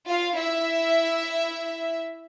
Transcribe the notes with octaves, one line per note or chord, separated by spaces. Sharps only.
F4 F5
E4 E5